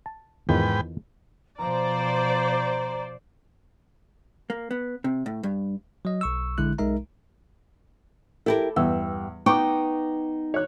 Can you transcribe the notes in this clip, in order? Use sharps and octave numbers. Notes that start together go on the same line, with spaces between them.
A5
E2 G#2 D#3 F3 B4 G5
B2 F3 C5 D5 A#5
A#3
B3
C3
A2
G2
F#3 D#5
B1 C#6 E6
A#1 D3 G#3 E4 F#6
B1 G#3 D#4 A#4 E5 A#5
E4 G4 A4 A#4
E2 G2 E6
B3 D#4 G5 C#6 D6
C#5 F#6